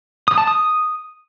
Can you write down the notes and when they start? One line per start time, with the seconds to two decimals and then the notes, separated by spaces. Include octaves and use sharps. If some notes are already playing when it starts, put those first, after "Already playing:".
0.28 D#6
0.38 A5
0.47 D#6